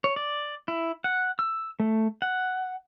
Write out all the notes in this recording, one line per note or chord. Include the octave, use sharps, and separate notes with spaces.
C#5
D5
E4
F#5
E6
A3
F#5